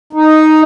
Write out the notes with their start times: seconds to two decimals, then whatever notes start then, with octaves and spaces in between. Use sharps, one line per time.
0.13 D#4